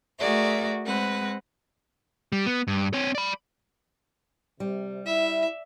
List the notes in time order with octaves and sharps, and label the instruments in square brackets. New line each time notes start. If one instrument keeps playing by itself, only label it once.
[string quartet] A3 F#4 G#4 A#4 D5 E5
G#3 C4 B4 F#5
[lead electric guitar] G3
B3
G2
C4 C#5
D5 B5
[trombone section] C3 [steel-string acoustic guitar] G3
[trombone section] E4 [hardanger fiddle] E5